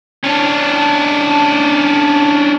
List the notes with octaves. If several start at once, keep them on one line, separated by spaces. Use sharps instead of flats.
C#4 D4